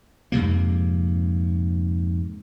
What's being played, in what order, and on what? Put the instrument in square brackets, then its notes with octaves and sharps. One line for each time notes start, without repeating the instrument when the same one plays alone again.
[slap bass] F2 G#2 C3 A#3